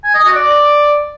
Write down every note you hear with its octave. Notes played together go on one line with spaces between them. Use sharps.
G#5
D#5
F#4
D5